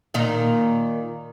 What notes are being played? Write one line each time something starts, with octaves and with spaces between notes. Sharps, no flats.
A#2 D#3 D#4